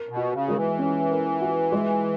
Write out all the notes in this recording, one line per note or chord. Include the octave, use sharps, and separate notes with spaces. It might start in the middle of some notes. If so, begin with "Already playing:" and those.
Already playing: A#4
B2
F#4
C#3
D#3 G#3
E3
C#4
A#4
F#4
G#3